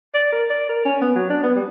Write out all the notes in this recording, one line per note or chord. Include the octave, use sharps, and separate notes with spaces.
D5
A#4
D5
A#4
C#4
B3
F#3
D4
B3
G3